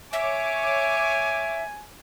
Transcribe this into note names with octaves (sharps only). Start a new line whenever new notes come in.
C#5 E5 G#5 D6